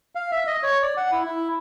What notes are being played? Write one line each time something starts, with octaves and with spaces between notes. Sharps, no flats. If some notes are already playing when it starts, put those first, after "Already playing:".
F5
E5
D#5
C#5
D5
F#5
E4
E4